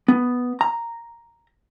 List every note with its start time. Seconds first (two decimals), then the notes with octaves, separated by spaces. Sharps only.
0.08 B3
0.61 A#5